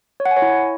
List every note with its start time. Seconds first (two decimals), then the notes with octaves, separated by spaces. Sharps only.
0.20 C#5
0.26 F#5
0.31 G#5
0.37 C#5
0.42 E4